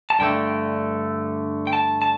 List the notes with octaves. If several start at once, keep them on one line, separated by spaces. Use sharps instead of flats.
A5
G2 D3 A3 G5
G5
A5
A5